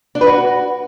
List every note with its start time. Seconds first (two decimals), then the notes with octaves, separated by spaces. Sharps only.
0.15 D4
0.21 B4
0.27 F#4